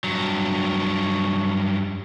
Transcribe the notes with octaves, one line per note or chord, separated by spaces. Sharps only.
G2 F#3